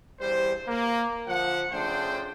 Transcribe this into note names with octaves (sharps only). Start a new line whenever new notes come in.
E2 G2 G3 C5
A#3
D3 F3 F#5
C#3 F3 A3 D4 C5 G5